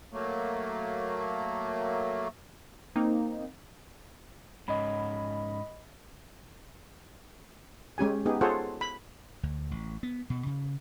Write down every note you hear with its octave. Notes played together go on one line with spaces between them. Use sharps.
F#3 A3 A#3
A#3 C4 D#4
G#2 C#4 D#5 B5
G#3 C#4 G4 G#5
B3 D#4 G4 G#4
F4 G#4 A4 C5 C#5 F#5
B5
D2
A1
B3
B2
C#3